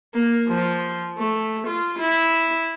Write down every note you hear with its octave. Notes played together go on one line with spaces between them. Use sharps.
A#3
F3
A3
F4
E4